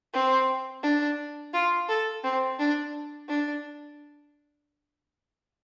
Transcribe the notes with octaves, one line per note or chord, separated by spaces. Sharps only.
C4
D4
F4
A4
C4
D4
D4